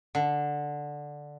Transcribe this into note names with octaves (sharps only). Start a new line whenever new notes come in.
D3